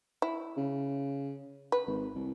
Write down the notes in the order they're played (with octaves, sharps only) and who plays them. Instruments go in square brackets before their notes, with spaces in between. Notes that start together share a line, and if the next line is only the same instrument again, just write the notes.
[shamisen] E4
[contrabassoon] C#3
[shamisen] B4
[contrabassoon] G#1
C2